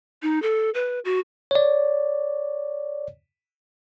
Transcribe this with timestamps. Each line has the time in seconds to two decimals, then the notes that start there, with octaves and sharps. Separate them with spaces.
0.22 D#4
0.42 A4
0.74 B4
1.05 F#4
1.51 C#5 D5